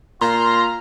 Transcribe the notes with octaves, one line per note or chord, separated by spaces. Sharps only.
A#2 F4 A#5 C6